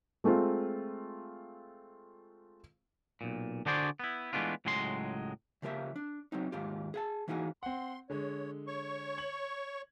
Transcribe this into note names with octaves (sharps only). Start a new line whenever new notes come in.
G#3 A3 C4 F4
B1 A#2
D3 D4 F#4 G#4 C5 D5
B3 E4
E3 G#3 A3 B3 D4 F4
C#2 A2 F#3 G#3 G4 C6
C#3 F3 A#3 G4 E5
D4
F#3 C4 D#4
D#2 G#2 F4 G4
G#4 F5 A5
E3 A#3 D#4 F#4 G#4
C4 F#5 C6
D3 G#3 C#5
C#5 C#6
G#6 F#7